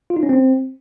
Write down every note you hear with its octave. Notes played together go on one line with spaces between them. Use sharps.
F4
D#4
C#4
C4